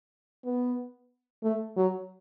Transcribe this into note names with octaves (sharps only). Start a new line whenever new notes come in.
B3
A3
F#3